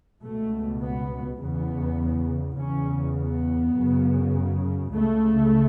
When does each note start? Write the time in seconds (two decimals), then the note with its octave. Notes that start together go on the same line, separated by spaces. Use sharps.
0.22 C#2 B2 A3
0.82 B3
1.40 E2 C#3 B3
2.58 E2 C#3 C#4
3.17 B3
3.76 F#2 C#3
4.94 C#2 C#3 A3